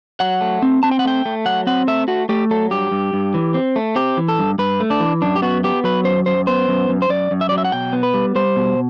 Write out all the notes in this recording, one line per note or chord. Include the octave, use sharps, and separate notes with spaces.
F#3 F#5
A3
C4
C4 A5
G5
F#5
A3 G5
A3
F#3 F#5
C4 F#5
A3 E5
A3 F#4
A3 G4
F#3 A4
G2 G4
G2
G2
E3
C4
A3
C4 G4
E3
A4
G2
G2 B4
A3
D4
E3
F#2 D4
G4
B3 F#4
B3 G4
F#3 B4
F#2 C5
F#2 C5
B3 C5
F#2
F#2
C5
F#2 D5
F#2
E5
F#3 D5
E5
F#5
B2 G5
B3
B4
G3
G3 C5
B2